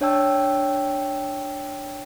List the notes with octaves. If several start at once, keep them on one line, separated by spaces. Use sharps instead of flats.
D4 C#5 D5 G5 A5 E6